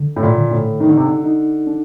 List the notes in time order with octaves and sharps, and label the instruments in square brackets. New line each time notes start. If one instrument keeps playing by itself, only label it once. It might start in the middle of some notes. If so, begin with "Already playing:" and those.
Already playing: [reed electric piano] D3
[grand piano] A2
A#2
[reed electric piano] D3
[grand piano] A2
[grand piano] D#3 [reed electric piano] D#4
[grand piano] D3
C3
D3
[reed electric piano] D#4
D4